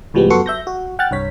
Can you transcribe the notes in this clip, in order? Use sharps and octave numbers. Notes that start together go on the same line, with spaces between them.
C#2 A2 F3 G3 G#3 B3
F#2 B3 F#4 A4 C6 C#7
E5 G6 A#6
F#4
F#5 G5 F6 F#6 A6
C2 G2 C#5 B6